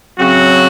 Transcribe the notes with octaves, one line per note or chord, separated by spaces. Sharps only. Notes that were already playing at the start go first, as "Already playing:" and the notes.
C#3 F#3 C4 F#4